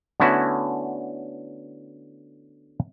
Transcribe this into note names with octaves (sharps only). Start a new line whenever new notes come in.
D3 A3 B3 C#4 E4 F#4